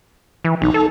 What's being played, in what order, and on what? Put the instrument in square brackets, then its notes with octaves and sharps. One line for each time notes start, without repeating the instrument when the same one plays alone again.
[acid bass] E3
[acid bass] B1 [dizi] D#4
[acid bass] A4